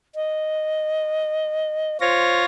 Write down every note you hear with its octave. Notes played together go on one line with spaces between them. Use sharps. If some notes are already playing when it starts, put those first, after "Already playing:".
D#5
F4 C5 C#5 A#6